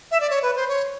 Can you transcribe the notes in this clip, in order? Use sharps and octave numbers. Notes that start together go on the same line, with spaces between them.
E5
D5
C#5
B4
C5
C#5